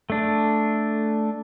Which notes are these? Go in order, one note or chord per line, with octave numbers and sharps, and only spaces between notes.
A3 D4